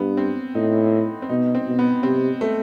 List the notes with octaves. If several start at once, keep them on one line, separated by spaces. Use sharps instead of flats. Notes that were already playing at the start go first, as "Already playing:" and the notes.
Already playing: G2 B3
C4
A2 D#4
C4
B2 D#4
C4
B2
B3
C3 C4
A3